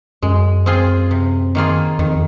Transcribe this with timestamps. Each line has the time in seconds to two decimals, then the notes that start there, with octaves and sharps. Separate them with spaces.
0.22 F#2 G#3
0.66 C4 F4 G#4
1.11 C3
1.55 D#3 A#3 F4 G#4
1.99 F2 D#3